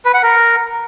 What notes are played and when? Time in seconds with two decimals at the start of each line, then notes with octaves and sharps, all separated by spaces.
0.05 B4
0.14 F#5
0.23 A#4